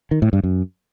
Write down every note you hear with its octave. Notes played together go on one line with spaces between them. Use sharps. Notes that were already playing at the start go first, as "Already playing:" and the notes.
D#3
A2
G2
F#2